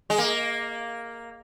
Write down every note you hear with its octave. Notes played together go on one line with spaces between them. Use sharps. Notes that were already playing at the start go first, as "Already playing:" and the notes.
G#3
A#3